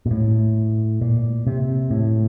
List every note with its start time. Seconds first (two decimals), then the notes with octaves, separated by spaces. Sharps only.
0.06 A#2
0.11 A2
1.01 A#2
1.47 C3
1.91 A2